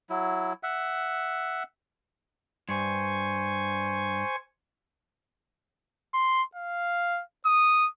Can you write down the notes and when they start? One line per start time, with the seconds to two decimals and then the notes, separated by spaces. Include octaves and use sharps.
0.10 F#3 E4
0.63 E5 F#5
2.69 G2 C5 G#5 C#6
6.14 C6
6.55 F5
7.46 D#6